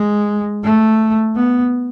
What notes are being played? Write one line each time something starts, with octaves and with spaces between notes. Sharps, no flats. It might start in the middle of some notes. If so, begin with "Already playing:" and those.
Already playing: G#3
A3
B3